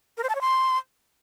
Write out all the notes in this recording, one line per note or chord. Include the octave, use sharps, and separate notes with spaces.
A#4
C5
A5
C#5
C6